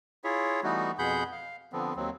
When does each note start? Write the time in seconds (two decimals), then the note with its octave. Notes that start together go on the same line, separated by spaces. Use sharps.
0.24 E4 F4 G#4 C#5 E5
0.63 E3 G3 A3 B3 D#4 F#4
0.99 F2 B2 G#4 F#5 B5 G6
1.32 F5
1.73 D3 F3 B3 C4
1.96 D#2 F#3 C4